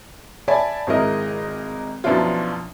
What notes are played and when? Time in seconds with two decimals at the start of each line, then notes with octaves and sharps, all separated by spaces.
0.48 D5 E5 G#5 A5 B5
0.87 G#1 G#3 E4 A#4 D#5
2.04 F#2 B2 F3 D4 E4 F4